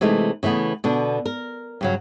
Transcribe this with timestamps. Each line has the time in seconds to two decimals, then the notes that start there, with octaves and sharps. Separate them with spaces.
0.01 C3 E3 G#3 A3 D#4
0.43 C#3 E3 A3 B3
0.84 B2 D3 D4
1.26 A#4
1.81 G2 C#3 F#3